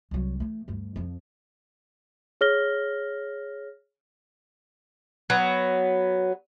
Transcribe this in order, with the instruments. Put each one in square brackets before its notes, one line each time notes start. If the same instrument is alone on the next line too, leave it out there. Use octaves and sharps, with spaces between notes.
[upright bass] C2 F#3
E3 A3
D2 G2
F2 F3
[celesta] G#4 C#5 F6 A#6 G7
[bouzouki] F#3 B3